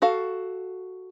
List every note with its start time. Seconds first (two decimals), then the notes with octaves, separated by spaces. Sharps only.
0.02 F#4 A4 F5